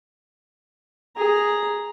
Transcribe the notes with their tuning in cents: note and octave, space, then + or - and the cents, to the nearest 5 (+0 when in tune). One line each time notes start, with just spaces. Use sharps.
G#4 +0 A#5 +0